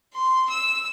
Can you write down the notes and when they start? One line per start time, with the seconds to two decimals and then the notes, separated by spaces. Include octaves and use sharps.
0.14 C6
0.49 E6